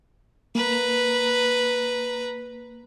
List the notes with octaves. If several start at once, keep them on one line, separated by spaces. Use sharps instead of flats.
A#3 B4 A#5